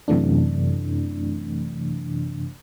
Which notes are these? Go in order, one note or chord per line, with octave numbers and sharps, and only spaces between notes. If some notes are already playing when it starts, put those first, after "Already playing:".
F#2 C3 E3 A3 D4